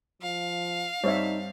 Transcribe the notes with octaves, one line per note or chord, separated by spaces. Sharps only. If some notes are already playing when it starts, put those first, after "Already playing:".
F3 F5
G2 C4 D#4 C#5 E5